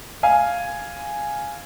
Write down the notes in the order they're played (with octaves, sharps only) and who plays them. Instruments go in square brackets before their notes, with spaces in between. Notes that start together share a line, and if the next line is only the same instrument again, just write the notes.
[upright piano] F5 G#5